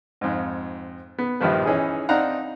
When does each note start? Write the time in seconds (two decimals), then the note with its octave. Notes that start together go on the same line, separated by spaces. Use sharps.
0.21 F2 G#2
1.18 B3
1.41 A#1 G2 D#3 F3 B4
1.65 E3 C#4 D#4 G#4
2.09 C4 D4 D#4 F5 F#5 A#5